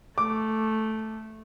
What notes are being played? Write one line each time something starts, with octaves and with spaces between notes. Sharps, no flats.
A3 D6